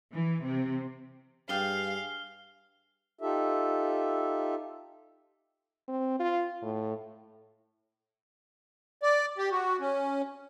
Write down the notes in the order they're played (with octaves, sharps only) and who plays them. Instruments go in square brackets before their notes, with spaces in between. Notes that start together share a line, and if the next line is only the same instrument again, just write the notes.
[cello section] E3
C3
[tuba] G2 [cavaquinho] G#4 D5 G5 [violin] F5 [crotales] F6 C7 G7
[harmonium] D#4 F4 G4 A4 E5
[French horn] C4
F4
A2
[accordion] D5
G4
F#4
C#4